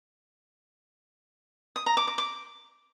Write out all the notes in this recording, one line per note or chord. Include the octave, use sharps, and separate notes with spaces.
D#6
A#5
D6
D6
D6